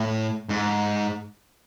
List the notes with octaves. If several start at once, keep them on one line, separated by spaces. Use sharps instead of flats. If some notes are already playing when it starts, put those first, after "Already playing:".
Already playing: A2
G#2